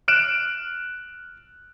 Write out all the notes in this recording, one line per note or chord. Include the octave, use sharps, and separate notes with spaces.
F6 F#6 D7 E7